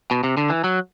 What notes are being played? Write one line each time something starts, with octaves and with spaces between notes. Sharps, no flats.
B2
C3
D3
E3
F#3